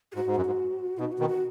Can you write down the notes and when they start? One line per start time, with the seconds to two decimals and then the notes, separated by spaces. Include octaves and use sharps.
0.12 G#4
0.15 G#2 F#4
0.27 G#2
0.36 F#2
0.46 G#2
0.99 B2 D#4
1.12 F#4
1.19 B2 D#3
1.27 F#4